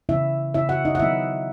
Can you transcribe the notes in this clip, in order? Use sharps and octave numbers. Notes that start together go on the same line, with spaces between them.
C#3 E3 B3 E4 E5
C#3 E3 B3 E4 E5
F#4 F#5
D#4 D#5
F#5
D#3 F#3 B3 E4 E5